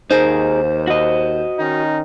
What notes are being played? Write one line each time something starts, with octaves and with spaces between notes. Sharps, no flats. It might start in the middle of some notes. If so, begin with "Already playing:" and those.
D#2 D#4 G#4 A#4 C5
F#4 D#5
D#3 C#4 D#4